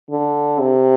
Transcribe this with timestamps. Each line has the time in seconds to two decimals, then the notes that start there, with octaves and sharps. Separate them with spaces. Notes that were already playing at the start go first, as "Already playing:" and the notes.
0.10 D3
0.60 C3